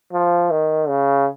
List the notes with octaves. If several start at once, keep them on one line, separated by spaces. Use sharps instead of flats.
F3
D#3
C#3